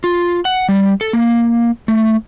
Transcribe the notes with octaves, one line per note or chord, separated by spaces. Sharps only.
F4
F#5
G3
A4
A#3
A3